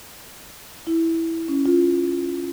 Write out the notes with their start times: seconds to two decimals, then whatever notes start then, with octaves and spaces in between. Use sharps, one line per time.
0.87 E4
1.48 C#4
1.66 F4